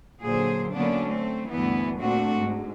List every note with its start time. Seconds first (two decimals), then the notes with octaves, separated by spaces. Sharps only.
0.22 A#2 D3 F#3 G#4 C5
0.74 D3 F#3 A#3 B3 C#4 D4
1.05 A3 C4
1.50 D2 G2 E3 B3
2.01 A#2 A3 C4 D4 F#4
2.38 G#2